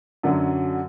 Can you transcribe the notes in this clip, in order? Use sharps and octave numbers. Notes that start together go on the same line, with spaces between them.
F#2 D3 F#3